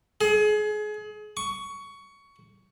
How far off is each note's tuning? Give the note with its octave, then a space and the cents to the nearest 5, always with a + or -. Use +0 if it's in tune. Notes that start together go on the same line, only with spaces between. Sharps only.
G#4 +30
C#6 +15